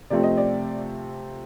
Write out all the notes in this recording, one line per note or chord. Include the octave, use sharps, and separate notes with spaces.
C3 F3 A3 C4 D5
D#5
D5